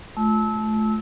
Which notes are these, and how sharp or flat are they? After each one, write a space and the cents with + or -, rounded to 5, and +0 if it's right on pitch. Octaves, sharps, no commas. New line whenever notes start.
A3 -25 F4 +0 E6 -25